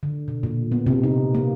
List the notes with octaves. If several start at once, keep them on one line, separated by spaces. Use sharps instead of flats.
D3
B2
A#2
B3
C3
D#4
A#3